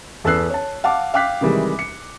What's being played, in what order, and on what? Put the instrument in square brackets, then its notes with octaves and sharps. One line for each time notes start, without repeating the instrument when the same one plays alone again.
[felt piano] E2 A4 B4 E6 F#6 C7
C#5 A5
F5 F#5 A5 D6
F5 G5 D6 F#6 B6
C3 D#3 E3 G3 G#3
C#7